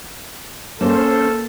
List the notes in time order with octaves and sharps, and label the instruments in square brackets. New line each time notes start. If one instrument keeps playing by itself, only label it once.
[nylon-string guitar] A#3 [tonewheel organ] C#4 C5 [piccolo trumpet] A4